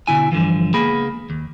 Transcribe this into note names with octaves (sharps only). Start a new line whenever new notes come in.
B2 D3 E4 G#5
G2 D3 E3 F3
C#2 A#3 B3 G#4 B5
D#2